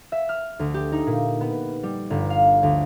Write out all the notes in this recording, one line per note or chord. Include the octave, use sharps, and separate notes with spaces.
E5
F6
D2
G4
D#4
A#2
B3
G3
G1
F5
D2